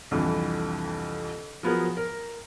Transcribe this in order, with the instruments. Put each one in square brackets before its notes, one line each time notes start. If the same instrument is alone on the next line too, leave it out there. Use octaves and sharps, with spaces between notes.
[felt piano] C2 F2 D3 E3
F3 F#3 B3 G#4 A#4
A#4